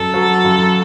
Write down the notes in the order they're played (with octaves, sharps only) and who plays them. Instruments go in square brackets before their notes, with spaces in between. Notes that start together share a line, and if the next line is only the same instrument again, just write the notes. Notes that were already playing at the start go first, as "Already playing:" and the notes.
Already playing: [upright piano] F#2 [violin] A4
[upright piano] F#3
F#2